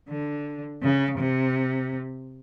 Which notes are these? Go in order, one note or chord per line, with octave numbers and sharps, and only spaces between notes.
D3
C#3
C3